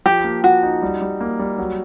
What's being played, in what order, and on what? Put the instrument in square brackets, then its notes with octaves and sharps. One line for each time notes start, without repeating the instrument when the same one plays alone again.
[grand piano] F3 [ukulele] G4
[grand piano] A#3
[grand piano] F3 [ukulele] F#4
[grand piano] D#4
G3
G3
A#3
G3
F#3